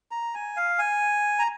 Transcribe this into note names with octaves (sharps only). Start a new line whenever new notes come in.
A#5
G#5
F5
G#5
A#5